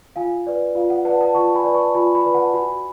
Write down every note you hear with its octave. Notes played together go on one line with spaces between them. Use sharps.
F4 F5 G#5
B4 D5
F4 F5
F#5
B4 D5 F#5 A5
F#5 A5
F4 A5 C#6
G#5 B5
B4 D5
A5 C#6
F4 G#5 B5
G#5 B5
B4 D5
F#5 A5
F#4 G#5 B5